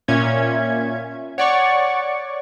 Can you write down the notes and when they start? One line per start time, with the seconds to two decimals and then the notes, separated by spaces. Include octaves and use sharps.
0.08 A#2 C#4 E5 G#6
1.38 C#5 D5 F#5 C#6